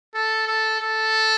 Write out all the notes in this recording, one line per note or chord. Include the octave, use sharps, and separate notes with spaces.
A4
A4
A4